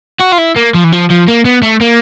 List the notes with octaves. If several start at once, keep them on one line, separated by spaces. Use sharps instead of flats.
F#4
F4
E4
A#3
F3
E3
F3
F3
A#3
B3
A3
A#3